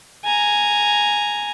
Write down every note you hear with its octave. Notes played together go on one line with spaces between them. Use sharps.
G#5 A#5